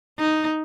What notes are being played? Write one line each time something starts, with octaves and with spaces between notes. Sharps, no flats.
D#4